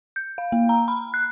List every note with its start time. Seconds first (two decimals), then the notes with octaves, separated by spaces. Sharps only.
0.16 G6
0.38 F5
0.52 A#3
0.69 A#5
0.88 B5
1.14 F#6